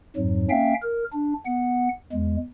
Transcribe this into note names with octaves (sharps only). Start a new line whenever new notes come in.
F2 G#2 F#3
A#3 C#4 E5 F5 G5
A#4
D4
B3 F#5
E2 G#3